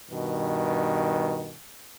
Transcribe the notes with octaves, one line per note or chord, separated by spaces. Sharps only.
G2 B2 D#3